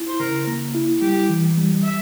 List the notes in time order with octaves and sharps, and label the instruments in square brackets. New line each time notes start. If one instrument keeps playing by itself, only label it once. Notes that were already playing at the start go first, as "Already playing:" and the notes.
Already playing: [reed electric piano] E4
[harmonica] C5
[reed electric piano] C#3 [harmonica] A#4
[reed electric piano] A#3
E4
[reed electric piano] G3 [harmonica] G4
[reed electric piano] E3
G3
[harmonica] E5